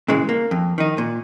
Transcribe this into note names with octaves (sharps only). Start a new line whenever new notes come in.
A#2 C#3 E3 G#3
A#3
F2
D#3 D#4
A#2